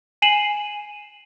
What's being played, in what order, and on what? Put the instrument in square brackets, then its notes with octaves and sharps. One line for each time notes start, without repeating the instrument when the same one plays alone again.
[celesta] G#5 C7 D#7 E7 F#7